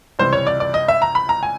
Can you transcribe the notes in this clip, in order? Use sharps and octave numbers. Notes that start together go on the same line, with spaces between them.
C#2 C3 E3 G3 C5
C#5
D5
D5
D#5
E5
A#5
B5
A#5
G#5